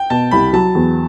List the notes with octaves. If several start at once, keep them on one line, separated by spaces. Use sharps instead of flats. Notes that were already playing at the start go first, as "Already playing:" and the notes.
Already playing: G5
B2 A5
C2 B5
F#3 A5
E2